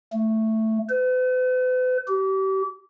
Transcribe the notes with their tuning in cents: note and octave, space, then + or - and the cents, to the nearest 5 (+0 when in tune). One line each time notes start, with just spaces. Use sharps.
A3 +5
B4 +45
G4 -35